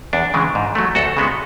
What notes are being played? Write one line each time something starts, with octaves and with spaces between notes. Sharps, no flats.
E2 D4
C#3 E3 G#3
G#2
F#3 A3
D2 F#4 A4
C#3 G#3 B3